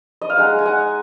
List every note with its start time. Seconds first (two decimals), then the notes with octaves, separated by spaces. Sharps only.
0.21 D#5
0.30 F5
0.38 G#3 D#4 F#5
0.59 G#5
0.66 F#5